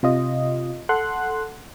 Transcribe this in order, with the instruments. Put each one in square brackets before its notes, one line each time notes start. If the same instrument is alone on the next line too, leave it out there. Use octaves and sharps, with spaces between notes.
[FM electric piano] C3 F4 D#5
A4 F#5 C6 F#6